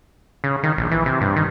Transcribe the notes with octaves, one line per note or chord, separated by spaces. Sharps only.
C#3
D#3
A#1
E3
C3
G2
D#3